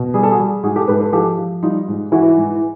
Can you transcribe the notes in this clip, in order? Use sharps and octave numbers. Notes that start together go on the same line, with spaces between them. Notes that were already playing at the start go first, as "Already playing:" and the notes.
Already playing: B2
G3 G#4
A4
F#4 G#4
G3
G#2 F#4 G#4
G4 A4
G#2 A4 B4
A4 B4
F3 G4 A4
F3
G3 D#4 F4
G#2
E3 E4 F#4
G#2